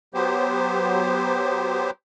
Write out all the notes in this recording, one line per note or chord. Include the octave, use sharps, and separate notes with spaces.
F#3 B3 G4 C5